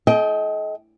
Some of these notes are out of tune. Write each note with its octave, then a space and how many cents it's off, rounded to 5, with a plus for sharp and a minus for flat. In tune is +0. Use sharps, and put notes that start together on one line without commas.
A4 -40 D#5 +25 G5 +0